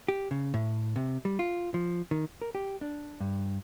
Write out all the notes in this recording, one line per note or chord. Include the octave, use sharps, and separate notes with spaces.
G4
C#3
A2
C3
G3
F4
F3
D#3
A#4
G4
D4
G2